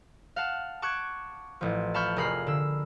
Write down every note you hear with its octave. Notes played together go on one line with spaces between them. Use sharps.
F5 F#5 A5
A5 C#6 D6 F#6 G#6
A1 F3
F5 A5 B5 C#6 F6 G6
F1 G#4 A#4 B5 C7
D3 E6